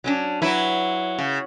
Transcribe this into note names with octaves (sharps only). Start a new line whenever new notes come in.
F#3 C#4 D4
F#3 E4 B4
C#3